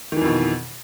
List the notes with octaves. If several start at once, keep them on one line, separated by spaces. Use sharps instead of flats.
F2 B2 D#3 E3